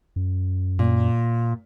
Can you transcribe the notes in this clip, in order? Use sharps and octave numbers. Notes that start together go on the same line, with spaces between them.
F#2
A#2